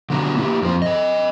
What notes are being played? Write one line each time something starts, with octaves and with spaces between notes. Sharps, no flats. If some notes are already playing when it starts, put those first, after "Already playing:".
D3 F#3 B3 D4 A#5
A#3 E4 G4
F2 C5
A4 D#5